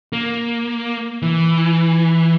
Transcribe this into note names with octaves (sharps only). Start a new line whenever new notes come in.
A#3
E3